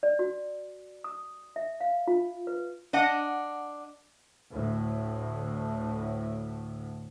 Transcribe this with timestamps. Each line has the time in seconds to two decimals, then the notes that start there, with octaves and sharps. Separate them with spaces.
0.03 D5
0.19 F#4
1.04 D#6
1.56 E5
1.81 F5
2.07 F4
2.47 B4
2.93 D4 D#5 F#5
4.51 D2 A2